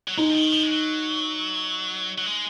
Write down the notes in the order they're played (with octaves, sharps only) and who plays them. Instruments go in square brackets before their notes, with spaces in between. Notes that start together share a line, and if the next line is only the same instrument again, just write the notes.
[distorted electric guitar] F#3
[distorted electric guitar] G#3 [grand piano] D#4
[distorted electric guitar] F3
D#3
F3
G#3
F#3
F#3
G#3